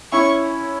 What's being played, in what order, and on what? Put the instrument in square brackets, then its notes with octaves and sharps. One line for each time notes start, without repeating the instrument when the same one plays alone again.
[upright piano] C#4 E4 [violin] C#6